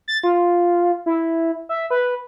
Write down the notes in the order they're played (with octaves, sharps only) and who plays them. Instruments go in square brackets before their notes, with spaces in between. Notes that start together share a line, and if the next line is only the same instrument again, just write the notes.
[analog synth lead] A6
F4
E4
E5
B4